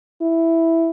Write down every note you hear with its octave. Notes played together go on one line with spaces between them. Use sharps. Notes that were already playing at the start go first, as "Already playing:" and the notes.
E4